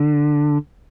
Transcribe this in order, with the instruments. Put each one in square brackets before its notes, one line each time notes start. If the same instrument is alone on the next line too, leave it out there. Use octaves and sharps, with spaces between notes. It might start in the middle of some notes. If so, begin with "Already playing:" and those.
Already playing: [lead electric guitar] D3